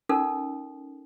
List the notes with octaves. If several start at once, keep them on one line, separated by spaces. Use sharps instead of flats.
C#4 D#4 A4 A#4